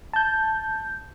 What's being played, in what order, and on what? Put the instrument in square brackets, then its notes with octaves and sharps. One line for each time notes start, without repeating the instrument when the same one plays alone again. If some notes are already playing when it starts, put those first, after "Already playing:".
[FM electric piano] A5 G6